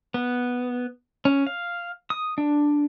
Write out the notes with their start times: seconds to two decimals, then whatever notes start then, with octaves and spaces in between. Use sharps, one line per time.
0.14 B3
1.25 C#4
1.47 F5
2.10 D#6
2.38 D4